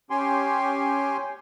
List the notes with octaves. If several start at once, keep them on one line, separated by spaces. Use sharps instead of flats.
C#4 G4 G5 G#5 C6